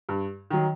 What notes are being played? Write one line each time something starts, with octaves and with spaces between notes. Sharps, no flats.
G2
D#3 F#3